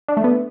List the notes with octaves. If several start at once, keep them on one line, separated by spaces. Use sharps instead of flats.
D4
A3
B3